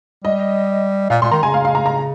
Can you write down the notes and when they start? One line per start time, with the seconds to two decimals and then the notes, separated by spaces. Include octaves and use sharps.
0.25 G3 D#5
1.10 A#2 F5
1.22 A#2 C6
1.32 D#3 A#5
1.43 C#3 G#5
1.54 F5
1.65 F5
1.75 A#5
1.86 A#5